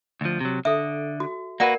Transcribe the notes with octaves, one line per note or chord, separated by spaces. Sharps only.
D2 F3
C3 F#3
D3 A4 E5
F#4
A#3 F#4 A#4 B4 D5 F#5